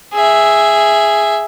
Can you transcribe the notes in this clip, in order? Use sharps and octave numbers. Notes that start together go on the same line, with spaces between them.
G#4 E5